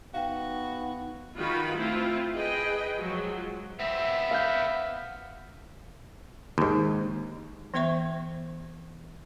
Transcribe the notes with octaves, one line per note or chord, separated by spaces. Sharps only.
B3 D#4 F#4 F5 G5
D#3 D#4 F4 F#4 B4 B5
A3 C4 E4 F4
G#4 B4 D#5 G5
F3 F#3 G#3
B3 C4 E5
F5 F#5 G6
D#2 G#2
E3 B3 C5 E5 C#6